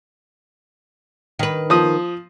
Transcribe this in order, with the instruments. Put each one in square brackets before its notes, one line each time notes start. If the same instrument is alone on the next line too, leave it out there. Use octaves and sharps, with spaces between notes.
[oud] D#3 B4
[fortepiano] F3 D#6